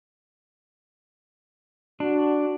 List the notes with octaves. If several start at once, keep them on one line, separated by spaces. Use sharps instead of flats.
D4 F#4